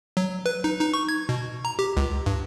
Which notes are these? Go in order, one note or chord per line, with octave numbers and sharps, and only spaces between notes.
F#3
B4
D#4
D#4
C#6
G#6
B2
A#5
G4
C#2
G2